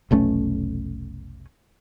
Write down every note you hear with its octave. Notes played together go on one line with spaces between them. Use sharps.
F1 B1 A3 C#4